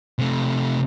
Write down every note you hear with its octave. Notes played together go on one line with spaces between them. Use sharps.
C3 A3